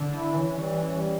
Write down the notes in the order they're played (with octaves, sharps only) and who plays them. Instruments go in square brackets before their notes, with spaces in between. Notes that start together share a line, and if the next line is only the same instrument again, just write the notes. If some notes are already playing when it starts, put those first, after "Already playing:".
Already playing: [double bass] D3
[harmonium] E4
[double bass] E3 [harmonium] C#4
[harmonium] G3
[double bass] E3
[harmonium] C#4
G3